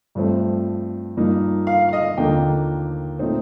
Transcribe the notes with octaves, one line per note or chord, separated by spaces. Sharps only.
G2 F3 A3 C4
G2 F3 A#3 D#4
F5
F5
D#5
D#2 D3 F3 A#3 G5
A#2 A3 C4 D#4